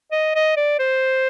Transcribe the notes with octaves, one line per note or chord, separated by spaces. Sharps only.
D#5
D#5
D5
C5